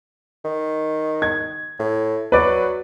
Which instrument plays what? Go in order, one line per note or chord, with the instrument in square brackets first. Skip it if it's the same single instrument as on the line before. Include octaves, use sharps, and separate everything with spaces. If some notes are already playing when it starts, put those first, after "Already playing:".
[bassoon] D#3
[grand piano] G#6
[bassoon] A2
[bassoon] F#3 [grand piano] B4 D5